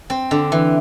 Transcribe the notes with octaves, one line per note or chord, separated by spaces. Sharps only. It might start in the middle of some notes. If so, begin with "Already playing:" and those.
C4
D3
E3